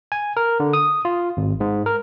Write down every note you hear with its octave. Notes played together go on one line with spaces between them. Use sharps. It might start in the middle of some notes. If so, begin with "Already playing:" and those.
G#5
A#4
D3
D#6
F4
G#1
G#2
A#4